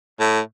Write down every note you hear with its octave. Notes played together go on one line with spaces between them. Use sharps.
A2